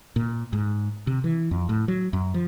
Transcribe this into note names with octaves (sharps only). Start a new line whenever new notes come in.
A#2
G#2
C3
E3
F2
A2
F#3
F#2
F3